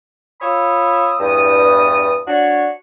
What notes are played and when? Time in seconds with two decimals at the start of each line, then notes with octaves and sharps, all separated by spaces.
0.41 F4 C#5 B5 D#6 E6
1.20 E2 G2 D#6
2.28 D4 F#4 C#5